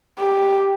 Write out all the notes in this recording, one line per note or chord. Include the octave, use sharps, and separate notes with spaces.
G4